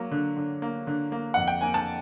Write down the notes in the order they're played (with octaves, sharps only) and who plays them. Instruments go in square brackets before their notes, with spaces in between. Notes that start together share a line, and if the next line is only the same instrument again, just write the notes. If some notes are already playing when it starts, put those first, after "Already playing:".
Already playing: [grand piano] F#3 A#3
D3
D3
A#3
D3
A#3
F2 F#5
G5
A#3 G#5
A5